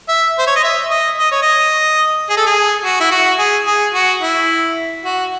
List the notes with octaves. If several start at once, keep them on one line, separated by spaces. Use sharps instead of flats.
E5
C5
C#5
D#5
E5
D#5
D#5
C#5
D#5
G#4
A4
G#4
F#4
E4
F#4
G#4
G#4
F#4
E4
F#4